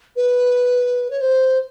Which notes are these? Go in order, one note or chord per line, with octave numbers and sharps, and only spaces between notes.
B4
C#5
C5